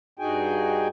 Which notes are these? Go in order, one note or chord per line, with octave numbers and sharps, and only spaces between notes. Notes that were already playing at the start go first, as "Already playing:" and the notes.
G2 D#4 F#4 G#4 G5 G#5